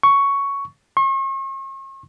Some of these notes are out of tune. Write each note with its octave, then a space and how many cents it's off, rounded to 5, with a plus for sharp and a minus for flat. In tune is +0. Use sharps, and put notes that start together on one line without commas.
C#6 +5
C#6 -45